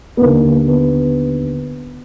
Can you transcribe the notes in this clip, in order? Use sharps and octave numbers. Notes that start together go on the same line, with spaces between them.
B3
D#2 D3 A#3
B3